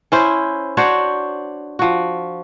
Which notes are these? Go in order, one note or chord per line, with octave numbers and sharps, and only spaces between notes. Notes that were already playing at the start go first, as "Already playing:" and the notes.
C#4 E4 C5
D4 F#4 C5 C#5
F3 F#4